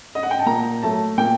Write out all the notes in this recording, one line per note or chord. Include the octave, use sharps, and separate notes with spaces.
D#5
F#5
G5
A5
A#2 A#5
F#3 A3 A5
A#2 G5